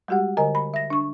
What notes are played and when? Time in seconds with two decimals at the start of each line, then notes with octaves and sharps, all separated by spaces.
0.08 G3 G#3 F#4 G4 F#5
0.37 D3 A#4 D#5 G#5 A#5
0.55 B5
0.74 E5 A#6
0.90 D4 C#6